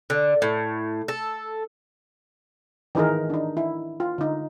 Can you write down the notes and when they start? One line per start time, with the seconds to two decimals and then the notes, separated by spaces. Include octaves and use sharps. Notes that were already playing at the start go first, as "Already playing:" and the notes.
0.10 D3
0.42 A2
1.08 A4
2.95 D#3 E3 D#4 G#4 A#4
3.30 D4 D#4
3.57 E4
4.00 F4
4.18 D3 D#4